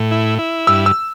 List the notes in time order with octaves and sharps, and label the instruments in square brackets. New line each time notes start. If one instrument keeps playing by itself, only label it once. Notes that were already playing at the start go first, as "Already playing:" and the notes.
Already playing: [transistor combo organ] A2
E4
E4
[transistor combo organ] G2 [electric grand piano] E6
[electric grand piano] E6